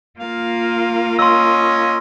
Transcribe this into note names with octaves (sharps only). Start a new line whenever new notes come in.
A#3 F4 F5
C#4 D#5 C6 E6